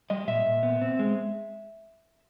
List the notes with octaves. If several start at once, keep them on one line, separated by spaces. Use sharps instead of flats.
G3 D#5
A#2 E5
A#2
B3
C4
G#3